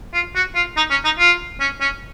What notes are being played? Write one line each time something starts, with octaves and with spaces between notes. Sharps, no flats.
F4
F#4
F4
D#4
C#4
D#4
F4
C#4
C#4